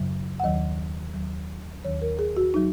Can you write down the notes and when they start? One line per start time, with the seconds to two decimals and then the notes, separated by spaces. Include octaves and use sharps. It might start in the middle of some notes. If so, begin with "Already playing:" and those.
Already playing: F#2 C#3 F#3
0.40 F#5
0.44 D#2 D#3 F#3 D#5
1.13 D#2 D#3 F#3
1.84 D#2 D#3 F#3 C#5
2.02 A#4
2.19 G#4
2.37 F#4
2.54 F#3 D#4